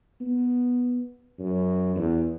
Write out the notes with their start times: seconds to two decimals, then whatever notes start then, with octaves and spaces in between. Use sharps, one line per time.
0.21 B3
1.39 F#2
1.96 E2